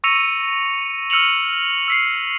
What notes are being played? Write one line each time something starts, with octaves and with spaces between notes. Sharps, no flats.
C#6 E6 A#6 C#7 D#7 F7
E6 F6 C#7 D#7 F7 F#7
E6 B6 C7